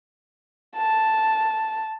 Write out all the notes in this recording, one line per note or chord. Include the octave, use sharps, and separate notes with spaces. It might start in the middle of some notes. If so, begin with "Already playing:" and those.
A5